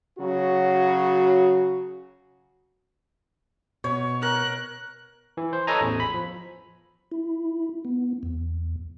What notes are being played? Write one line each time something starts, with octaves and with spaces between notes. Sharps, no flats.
C#3 F#3 F#4
B2 C#5
A#4 F#6
E3
C5
A4 B4 C#5 D#5 G#5 A#5
A1 E2
B5
F3
E4
B3
E2